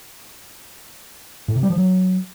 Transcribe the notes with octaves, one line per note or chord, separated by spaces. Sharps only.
A2
C3
G3
F3
F#3